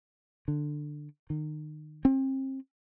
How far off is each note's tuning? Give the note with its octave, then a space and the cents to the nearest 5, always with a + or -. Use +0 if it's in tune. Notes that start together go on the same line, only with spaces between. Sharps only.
D3 +15
D#3 -30
C4 +35